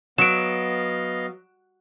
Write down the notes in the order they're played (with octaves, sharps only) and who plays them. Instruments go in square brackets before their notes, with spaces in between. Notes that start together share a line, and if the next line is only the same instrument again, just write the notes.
[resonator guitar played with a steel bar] F#3 [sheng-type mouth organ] B3 D#5 F5 [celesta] D7 E7